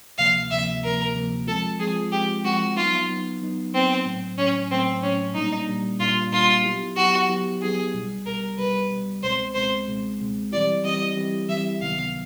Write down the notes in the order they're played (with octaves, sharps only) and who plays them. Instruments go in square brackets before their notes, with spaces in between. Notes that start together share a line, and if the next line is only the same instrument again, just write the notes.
[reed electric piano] D2 C3 F3 A#3 [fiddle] F5
[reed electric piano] D2 C3 F3 A#3 [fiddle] E5
[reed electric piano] D2 C3 F3 A#3 [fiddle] A#4
[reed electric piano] D2 C3 F3 A#3
[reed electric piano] F3 G#3 C4 F4 [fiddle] A4
[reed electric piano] F3 G#3 C4 F4 [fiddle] G#4
[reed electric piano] F3 G#3 C4 F4 [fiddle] G4
[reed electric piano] F3 G#3 C4 F4 [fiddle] F#4
[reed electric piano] F#3 B3 D#4 [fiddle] F4
[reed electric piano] F#3 B3 D#4
F#3 B3 D#4
[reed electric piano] F#3 B3 D#4 [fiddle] C4
[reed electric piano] A2 F#3 A3
[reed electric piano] A2 F#3 A3 [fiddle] C#4
[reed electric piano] A2 F#3 A3 [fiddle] C4
[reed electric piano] A2 F#3 A3 [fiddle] C#4
[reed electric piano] A#2 G3 A#3 D4 [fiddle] D#4
[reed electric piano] A#2 G3 A#3 D4
[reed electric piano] A#2 G3 A#3 D4 [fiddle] F4
[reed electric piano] A#2 G3 A#3 D4 [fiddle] F4
[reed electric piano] F#3 B3 E4 G4
[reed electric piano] F#3 B3 E4 G4 [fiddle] F#4
[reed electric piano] F#3 B3 E4 G4
[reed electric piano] F#3 B3 E4 G4 [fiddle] G#4
[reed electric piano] C2 B2 G3
[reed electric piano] C2 B2 G3 [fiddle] A#4
[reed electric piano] C2 B2 G3 [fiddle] B4
[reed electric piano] C2 B2 G3
[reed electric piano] C#2 B2 G#3 C4 [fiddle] C5
[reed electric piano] C#2 B2 G#3 C4 [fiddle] C5
[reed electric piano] C#2 B2 G#3 C4
C#2 B2 G#3 C4
[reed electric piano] E3 G3 C4 E4 G4 [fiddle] D5
[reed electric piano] E3 G3 C4 E4 G4 [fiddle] D#5
[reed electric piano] E3 G3 C4 E4 G4
[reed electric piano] E3 G3 C4 E4 G4 [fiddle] E5
[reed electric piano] C#2 C3 D#3 F#3 B3 [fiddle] F5